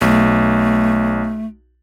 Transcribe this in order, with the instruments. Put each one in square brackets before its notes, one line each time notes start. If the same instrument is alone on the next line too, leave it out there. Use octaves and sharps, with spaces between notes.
[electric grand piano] B1 [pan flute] A3